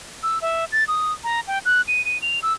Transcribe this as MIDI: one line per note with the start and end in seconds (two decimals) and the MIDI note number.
0.23 0.39 88
0.42 0.65 76
0.72 0.84 93
0.88 1.13 87
1.24 1.40 82
1.48 1.59 79
1.65 1.82 90
1.88 2.04 99
2.05 2.20 99
2.22 2.39 101
2.43 2.53 88